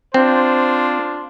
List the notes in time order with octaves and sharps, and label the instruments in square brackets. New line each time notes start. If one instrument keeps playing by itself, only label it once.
[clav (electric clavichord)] C4 [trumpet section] D4 F4 C5